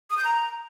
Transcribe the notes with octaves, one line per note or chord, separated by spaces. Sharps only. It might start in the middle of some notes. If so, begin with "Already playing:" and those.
D#6
G6
A#5